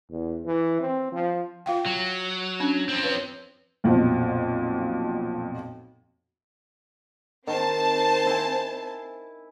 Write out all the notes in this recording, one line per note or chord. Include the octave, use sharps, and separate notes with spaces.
E2
E3
C4
F3
F4 F5 G5
F#3
C#4 D4
F3 C4
B4 C#5
B1 F2 A#2
D#3 C4 C5 A5
E4 G#5